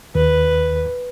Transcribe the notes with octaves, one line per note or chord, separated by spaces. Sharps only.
D#2 B4